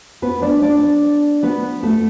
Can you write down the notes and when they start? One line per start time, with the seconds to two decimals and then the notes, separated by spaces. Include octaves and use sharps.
0.22 B3 B4
0.42 D4 D5
0.62 D4 D5
1.43 B3 B4
1.83 A3 A4